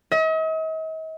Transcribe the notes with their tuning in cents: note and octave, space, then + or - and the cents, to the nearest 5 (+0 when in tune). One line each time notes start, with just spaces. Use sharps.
D#5 +45